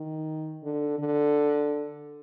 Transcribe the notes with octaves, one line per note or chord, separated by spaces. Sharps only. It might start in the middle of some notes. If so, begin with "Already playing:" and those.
Already playing: D#3
D3
D3